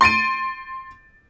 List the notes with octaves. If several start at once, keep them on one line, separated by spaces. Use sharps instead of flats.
C6 A6 D7 D#7